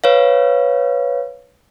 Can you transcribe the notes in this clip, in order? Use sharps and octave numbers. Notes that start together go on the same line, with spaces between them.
B4 C#5 F5